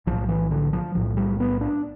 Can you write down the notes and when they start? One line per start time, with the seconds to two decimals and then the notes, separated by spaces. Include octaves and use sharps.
0.07 B1 A2 F3
0.29 E3
0.51 D3
0.73 F3
0.95 B1 A2 F3
1.17 G3
1.40 B3
1.61 D4